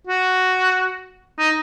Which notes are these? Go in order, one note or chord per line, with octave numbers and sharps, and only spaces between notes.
F#4
D#4